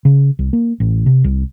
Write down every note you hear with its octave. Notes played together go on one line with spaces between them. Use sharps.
C#3
C2
A#3
A1
C3
C2